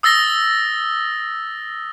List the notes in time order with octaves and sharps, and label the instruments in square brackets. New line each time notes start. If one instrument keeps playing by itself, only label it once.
[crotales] D#6 E6 A6 A#6 G7